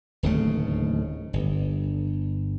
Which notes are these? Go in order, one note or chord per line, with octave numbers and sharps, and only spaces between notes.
D1 D#2 C#3 A3
G1